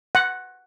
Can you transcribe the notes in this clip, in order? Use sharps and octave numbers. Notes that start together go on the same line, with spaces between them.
F#5